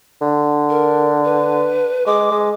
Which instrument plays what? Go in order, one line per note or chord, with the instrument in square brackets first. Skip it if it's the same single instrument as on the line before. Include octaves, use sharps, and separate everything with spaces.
[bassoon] D3
[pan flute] A#4
B4
[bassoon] G#3 [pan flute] D6
[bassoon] G#3